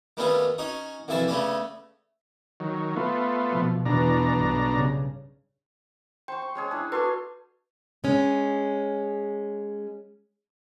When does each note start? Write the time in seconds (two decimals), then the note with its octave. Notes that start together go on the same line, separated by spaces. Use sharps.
0.17 D#3 G3 A3 B3 C#4 F4
0.58 C#4 D#4 F#4
1.08 C2 F2 E3 F#4 C5 A5
1.28 C#3 A3 B3 C#4 D4
2.60 D#3 F#3
2.96 A3 B3 F4
3.49 B2 F3
3.86 E2 B2 E3 D4 A#5
4.36 B1 G2
4.71 G2 C#3
6.28 C5 G5 C6 C#6
6.42 C#6
6.55 G#3 C#4 G#4
6.71 D4 E4
6.92 F#4 A4 B4 C6 C#6
8.04 G#3 C#4